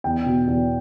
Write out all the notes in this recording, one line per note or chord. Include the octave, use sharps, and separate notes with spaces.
E2 G5
B2
E2